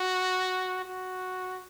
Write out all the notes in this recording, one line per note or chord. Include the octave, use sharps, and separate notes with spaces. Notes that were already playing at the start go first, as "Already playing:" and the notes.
Already playing: F#4
F#4